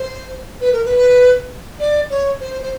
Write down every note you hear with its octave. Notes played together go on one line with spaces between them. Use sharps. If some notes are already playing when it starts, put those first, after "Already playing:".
Already playing: C5
B4
A#4
B4
D5
C#5
C5
C5